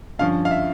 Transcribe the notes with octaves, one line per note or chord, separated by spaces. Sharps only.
G2 D3 F3 C#4 F5
F5
E5